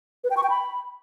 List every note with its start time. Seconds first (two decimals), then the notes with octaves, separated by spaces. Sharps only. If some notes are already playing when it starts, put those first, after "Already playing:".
0.24 B4
0.30 G5
0.37 C#6
0.43 G5
0.50 B5